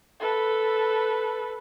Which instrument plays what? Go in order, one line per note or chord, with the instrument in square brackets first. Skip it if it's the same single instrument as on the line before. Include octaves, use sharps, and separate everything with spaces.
[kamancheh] A4 B4